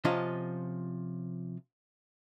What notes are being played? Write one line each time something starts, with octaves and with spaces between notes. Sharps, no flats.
C3 F3 C#4 F4 D#5